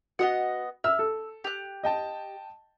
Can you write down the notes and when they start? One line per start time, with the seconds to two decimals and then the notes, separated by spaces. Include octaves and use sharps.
0.19 B3 F#4 D#5 F#5
0.84 E5 E6 F6
0.99 A4
1.44 G4 F#6
1.84 D#5 G5 A5